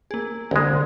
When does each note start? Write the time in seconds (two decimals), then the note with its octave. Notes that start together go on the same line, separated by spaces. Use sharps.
0.11 A#3 G#4
0.51 C2 D3 G#3